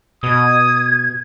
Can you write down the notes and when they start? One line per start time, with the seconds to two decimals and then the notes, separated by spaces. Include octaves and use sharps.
0.23 B2 D#6 G#6